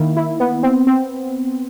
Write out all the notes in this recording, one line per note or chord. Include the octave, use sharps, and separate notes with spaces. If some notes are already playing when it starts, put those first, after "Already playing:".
Already playing: D#3 A#3 E4
E4
B3
C4
C4